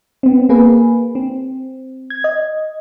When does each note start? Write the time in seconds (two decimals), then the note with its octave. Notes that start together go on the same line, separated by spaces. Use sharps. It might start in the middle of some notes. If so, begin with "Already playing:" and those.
0.23 B3 C4
0.49 A#3 G#4 B4
1.15 C4
2.10 G#6
2.24 D#5